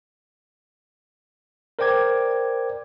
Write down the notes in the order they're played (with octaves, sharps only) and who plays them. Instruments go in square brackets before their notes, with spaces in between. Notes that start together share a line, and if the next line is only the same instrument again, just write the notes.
[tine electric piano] A#4 C5 D5 G5 D6 G#6